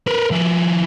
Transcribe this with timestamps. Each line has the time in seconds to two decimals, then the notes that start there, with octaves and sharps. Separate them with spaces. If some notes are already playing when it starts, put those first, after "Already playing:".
0.07 A#4 B4
0.31 F3 E4